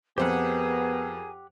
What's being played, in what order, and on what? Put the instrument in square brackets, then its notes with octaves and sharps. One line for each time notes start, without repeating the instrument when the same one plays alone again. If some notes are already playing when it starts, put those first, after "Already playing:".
[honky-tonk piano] F2 C4 [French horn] B3 [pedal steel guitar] G4 F#5 [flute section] G#4 A#4 G#5